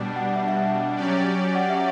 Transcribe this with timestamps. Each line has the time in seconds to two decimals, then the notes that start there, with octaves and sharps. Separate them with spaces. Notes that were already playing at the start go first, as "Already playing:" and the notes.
Already playing: B2 G3 D4
0.16 F#5
0.36 E5
0.48 E5
0.56 F#5
0.95 F#3 C#4 G4 D5
1.55 F#5
1.70 E5